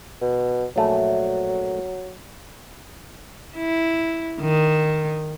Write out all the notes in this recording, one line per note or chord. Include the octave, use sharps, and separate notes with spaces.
B2
A#1 F#3 A3
E4
D#3